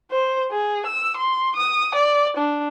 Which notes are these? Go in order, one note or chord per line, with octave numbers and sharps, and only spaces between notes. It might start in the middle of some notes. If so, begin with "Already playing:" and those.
C5
G#4
E6
C6
D#6
D5
D4